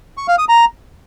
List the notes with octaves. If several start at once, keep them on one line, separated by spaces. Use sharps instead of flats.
C#6
F5
D#6
A#5